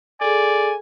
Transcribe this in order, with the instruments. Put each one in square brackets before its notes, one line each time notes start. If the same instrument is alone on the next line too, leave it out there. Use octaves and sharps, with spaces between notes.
[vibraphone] G#4 A4 [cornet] D5 [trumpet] G#5